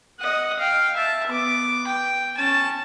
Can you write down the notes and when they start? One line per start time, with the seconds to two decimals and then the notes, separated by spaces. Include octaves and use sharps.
0.20 D#5 F#5
0.60 F5 G5
0.96 E5 A5
1.28 B3 D6
1.87 G5
2.37 C#4 A5